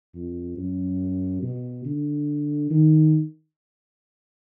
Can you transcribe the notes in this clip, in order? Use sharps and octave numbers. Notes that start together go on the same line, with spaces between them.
F2
F#2
B2
D3
D#3